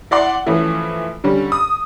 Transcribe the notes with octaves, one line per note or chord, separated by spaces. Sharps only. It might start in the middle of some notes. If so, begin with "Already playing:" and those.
E4 D5 F#5 C6
E3 F3 A3 C#4 E4 F4
D3 G3 C#4
D#6